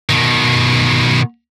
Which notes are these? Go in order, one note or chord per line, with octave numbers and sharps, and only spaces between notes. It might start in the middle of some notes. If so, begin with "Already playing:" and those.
B2 D#3